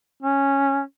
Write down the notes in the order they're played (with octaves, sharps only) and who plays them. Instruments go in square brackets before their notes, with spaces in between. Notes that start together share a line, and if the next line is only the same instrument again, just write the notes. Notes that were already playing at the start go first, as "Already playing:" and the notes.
[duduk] C#4